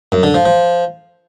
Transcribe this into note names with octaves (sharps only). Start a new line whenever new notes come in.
F#2
D3
F3
F3